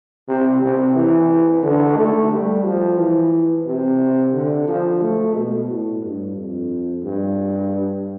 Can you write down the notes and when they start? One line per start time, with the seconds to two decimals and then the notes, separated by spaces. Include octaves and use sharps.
0.29 C3
0.62 C3
0.96 E3
1.63 D3
1.97 A3
2.32 G3
2.65 F3
2.98 E3
3.67 C3
4.33 D3
4.68 F3
5.02 A3
5.35 B2
5.69 A2
6.02 G2
6.37 F2
7.04 G2